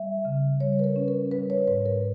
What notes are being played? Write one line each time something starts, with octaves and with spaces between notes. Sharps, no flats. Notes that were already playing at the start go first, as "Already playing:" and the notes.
Already playing: G3 E5
C#3
G3 C#5
B4
A#4
C#4
A#4
G3 B4
C#5
G#2 B4
A#4